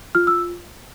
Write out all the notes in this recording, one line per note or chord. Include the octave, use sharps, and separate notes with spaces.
F4 F6
E6